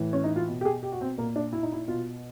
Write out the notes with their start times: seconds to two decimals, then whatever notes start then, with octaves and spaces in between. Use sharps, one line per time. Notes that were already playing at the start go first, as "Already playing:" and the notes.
Already playing: A2 E3
0.13 C#4
0.24 D#4
0.36 F4
0.48 B2
0.61 G4
0.65 G#4
0.83 G4
0.92 F#4
1.01 C4
1.18 A#2 A#3
1.36 D4
1.53 E4
1.63 D#4
1.72 E4
1.88 B2 F4